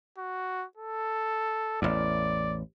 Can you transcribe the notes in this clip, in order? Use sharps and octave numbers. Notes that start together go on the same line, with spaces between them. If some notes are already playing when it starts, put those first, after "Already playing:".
F#4
A4
A1 E2 D5